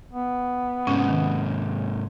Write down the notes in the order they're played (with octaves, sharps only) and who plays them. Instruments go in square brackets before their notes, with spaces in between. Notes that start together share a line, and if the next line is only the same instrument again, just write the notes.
[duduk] B3
[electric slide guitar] G#2 C3 [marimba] C#4
[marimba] D#3